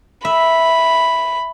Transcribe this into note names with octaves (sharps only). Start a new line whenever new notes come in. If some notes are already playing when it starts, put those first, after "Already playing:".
E5 B5